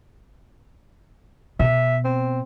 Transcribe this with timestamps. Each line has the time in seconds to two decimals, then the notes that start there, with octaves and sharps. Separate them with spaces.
1.59 B2 E5
2.05 C4